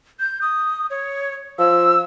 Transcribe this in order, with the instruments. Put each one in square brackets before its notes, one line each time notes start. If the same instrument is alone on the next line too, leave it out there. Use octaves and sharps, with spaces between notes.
[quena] G6
D#6
C#5
[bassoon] F3 [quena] E6